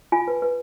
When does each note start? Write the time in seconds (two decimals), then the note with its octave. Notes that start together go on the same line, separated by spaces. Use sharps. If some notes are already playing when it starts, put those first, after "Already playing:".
0.12 F4 G#5
0.28 B4
0.42 B4